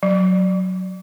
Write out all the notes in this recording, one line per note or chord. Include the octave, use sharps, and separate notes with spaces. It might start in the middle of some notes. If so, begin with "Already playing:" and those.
F#3